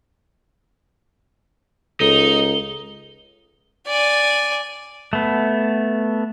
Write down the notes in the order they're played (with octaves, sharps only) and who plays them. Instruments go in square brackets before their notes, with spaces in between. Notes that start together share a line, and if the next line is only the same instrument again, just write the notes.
[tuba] C#2 [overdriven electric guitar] D#4 [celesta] A4 [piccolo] G7
[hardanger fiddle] D5 G#5
[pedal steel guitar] A3 B3